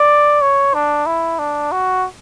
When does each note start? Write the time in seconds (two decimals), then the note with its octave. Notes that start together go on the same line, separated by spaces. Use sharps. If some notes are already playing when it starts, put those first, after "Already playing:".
Already playing: D5
0.42 C#5
0.74 D4
1.06 E4
1.39 D4
1.72 F#4